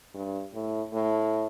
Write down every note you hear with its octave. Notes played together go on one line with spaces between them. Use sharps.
G2
A2
A2